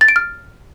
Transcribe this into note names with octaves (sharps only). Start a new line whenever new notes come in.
A6
D7
F6